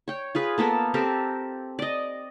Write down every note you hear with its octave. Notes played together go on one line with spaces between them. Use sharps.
C#5 G5
F4 G#4 B4
A#3 B3 A4 A#4
C4 G4 A4 A#4
D5 D#5